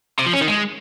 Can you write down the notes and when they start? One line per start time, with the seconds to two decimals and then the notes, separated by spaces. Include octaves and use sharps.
0.19 C3
0.26 F3
0.33 C#4
0.41 D#3
0.48 G#3